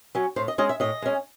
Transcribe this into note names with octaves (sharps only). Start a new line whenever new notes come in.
F#3 C#4
A2 C5
D#5
G#3 C#4 D#5
E5
A2 D#5
G#3 C#4